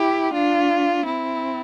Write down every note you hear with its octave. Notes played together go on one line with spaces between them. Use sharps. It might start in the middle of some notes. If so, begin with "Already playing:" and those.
Already playing: E4 G4
D4 F4
C4 E4